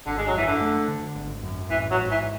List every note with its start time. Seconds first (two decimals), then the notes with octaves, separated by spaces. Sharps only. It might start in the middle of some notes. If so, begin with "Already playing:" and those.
0.06 G#1 D3
0.18 G#3
0.28 F#3
0.34 F#2 E3
0.47 D3
0.61 A3
0.88 D3
1.15 G#1
1.43 F#2
1.70 A1 E3
1.91 F#3
1.97 G#2
2.11 E3